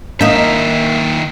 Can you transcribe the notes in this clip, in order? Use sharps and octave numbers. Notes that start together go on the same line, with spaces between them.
D#3 A#3 D#4 E5